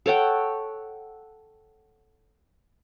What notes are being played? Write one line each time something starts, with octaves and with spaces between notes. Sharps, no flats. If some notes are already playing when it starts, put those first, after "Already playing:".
A4 C#5 F#5 G5